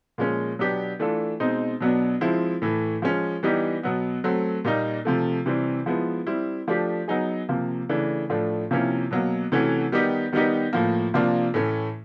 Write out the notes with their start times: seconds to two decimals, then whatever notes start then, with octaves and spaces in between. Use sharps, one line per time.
0.18 A#2 F3 G#3 C#4
0.59 B2 F#3 B3 D4 G4
0.99 E3 A3 D4 F4 A4
1.40 B2 G#3 C4 D#4
1.80 B2 F#3 B3 D4
2.21 F3 G#3 C4 E4
2.62 A2 E3 A3
3.02 F3 G#3 C#4
3.43 E3 G3 B3 D#4 G4
3.83 B2 F#3 B3
4.24 F#3 A3 C4
4.64 A#2 G3 A#3 D#4
5.05 C3 F3 A3
5.46 C3 E3 G3 C4
5.86 F3 G#3 B3 E4
6.27 G3 C4 E4
6.68 F3 A3 D4 G4
7.08 F#3 B3 D#4 G#4
7.49 C3 F3 A#3
7.89 C#3 E3 A3 D4
8.29 A2 F3 A3 D4
8.71 C3 F3 A#3 C#4 E4
9.11 B2 F#3 A#3
9.52 C3 E3 A3 C#4 F#4
9.92 D#3 G3 B3 D#4 G4
10.33 D#3 G3 B3 D#4 G4
10.73 A2 F3 A#3
11.14 C3 F3 A#3 D4 F4
11.54 A2 E3 A3 C#4